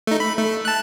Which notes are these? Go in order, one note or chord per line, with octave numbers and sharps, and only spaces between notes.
A3 D#4
B5
A3
A5 F#6